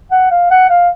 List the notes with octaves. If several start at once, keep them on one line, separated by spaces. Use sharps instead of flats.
F#5
F5
F#5
F5